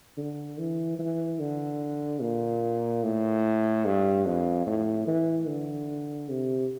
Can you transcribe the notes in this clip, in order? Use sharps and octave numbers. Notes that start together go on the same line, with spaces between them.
D3
E3
E3
D3
A#2
A2
G2
F2
A2
E3
D3
C3